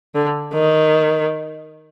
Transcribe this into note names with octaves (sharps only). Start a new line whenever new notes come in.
D3
D#3